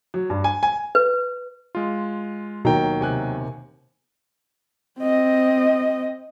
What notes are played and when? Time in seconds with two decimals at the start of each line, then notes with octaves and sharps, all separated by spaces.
0.14 F#3
0.30 G2
0.44 G#5
0.63 G#5
0.95 B4
1.75 G#3 F4
2.65 D#2 B2 D#3 F#3 G5 A#5
3.01 C3 G#5 F#6
5.00 C4 D#5